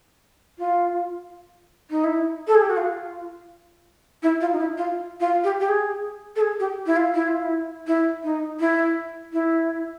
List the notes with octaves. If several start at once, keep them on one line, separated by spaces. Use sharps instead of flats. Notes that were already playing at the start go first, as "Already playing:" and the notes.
F4
D#4
E4
A4
G#4
G4
F#4
F4
E4
F4
D#4
E4
F4
F4
G4
G4
G#4
A4
G#4
G4
E4
F4
E4
F4
E4
E4
D#4
E4
E4